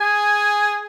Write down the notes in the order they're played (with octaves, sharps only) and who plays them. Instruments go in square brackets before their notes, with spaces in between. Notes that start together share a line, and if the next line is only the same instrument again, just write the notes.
[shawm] G#4 [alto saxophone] G#5